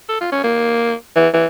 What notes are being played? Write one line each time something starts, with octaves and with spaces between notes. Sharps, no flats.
A4
F4
C#4
A#3
E3
E3